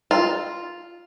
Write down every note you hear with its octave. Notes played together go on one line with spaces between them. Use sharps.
F4